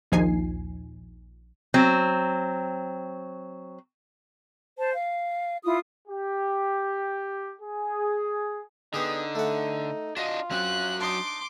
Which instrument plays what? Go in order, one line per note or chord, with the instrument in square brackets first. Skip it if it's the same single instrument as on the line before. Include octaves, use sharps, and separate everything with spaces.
[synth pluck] A#1 D#2 F3 D#4 G#5 C7
[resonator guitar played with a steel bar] F#3 C4
[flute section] C5 A5
F5
E4 F4 D#6
[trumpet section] G4
G#4
[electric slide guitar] D3 [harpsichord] B3 G4 G#4 [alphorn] D#4
[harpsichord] A3 F#5
[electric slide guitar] D4 D#5 [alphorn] F4 [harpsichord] F#4
[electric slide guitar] F#3 C#4 F#4 [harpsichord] C4 [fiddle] F#6
[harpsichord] D4 D#4 [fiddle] C6 D6